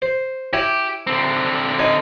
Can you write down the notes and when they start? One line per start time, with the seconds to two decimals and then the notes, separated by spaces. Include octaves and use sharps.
0.02 C5
0.53 E4 G4 C#5 G#5
1.07 D3 C4
1.79 D#4 C#5 G#5